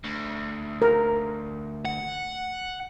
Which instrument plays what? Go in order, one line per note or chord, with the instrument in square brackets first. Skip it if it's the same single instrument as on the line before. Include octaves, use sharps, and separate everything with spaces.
[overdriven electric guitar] D2
[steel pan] A#4
[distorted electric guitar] F#5